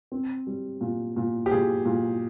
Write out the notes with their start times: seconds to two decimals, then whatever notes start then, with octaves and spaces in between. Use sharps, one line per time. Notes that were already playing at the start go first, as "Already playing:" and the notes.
0.12 C4
0.47 G3
0.81 A#2
1.16 A#2
1.46 G4
1.51 A#2 G#4
1.85 A#2